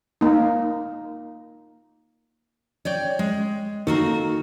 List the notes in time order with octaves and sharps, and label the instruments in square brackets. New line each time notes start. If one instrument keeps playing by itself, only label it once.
[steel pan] A#3 D#4
[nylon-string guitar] C#5 D5 G5
G#3
[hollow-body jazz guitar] D#3 [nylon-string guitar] A#3 F#4 A4